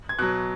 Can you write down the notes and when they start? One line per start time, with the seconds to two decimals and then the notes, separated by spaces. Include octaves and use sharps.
0.09 G#6
0.19 B2 F#3 F#6